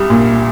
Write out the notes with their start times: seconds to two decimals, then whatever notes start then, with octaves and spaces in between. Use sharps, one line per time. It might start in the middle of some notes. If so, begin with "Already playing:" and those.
Already playing: C2 G3
0.10 A#2